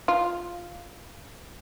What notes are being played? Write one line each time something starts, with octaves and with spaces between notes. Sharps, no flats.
F4